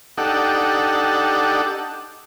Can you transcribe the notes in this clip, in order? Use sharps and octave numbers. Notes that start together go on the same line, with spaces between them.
D4 D#4 G4 A4 F#5